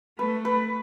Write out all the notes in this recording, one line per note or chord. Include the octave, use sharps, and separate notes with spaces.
A3 B4
B4